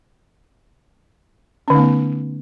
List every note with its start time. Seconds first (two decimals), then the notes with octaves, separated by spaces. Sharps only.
1.68 C#4
1.70 D3
1.73 D#4
1.75 A3
1.78 B3